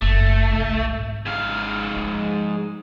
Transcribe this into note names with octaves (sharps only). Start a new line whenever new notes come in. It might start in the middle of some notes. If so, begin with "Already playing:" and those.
F#1 A3
C2
G#1
G#2 F5
F3